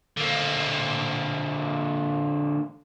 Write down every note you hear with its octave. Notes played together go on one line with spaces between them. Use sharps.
D3 A#3